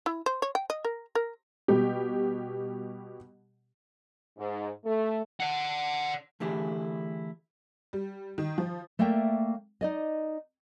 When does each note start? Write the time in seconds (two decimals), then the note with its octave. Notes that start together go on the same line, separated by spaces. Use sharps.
0.06 E4
0.26 C5
0.42 C#5
0.55 G5
0.70 D#5
0.85 A#4
1.15 A#4
1.68 B2 G3 G4
4.38 G#2
4.85 A3
5.40 D5 F#5
6.40 D3 E3 A3 E4 G4 G#4
7.93 G3
8.38 D#3
8.58 F3
8.99 A3 A#3 D5 E5 G5
9.81 D#4 D5 D#5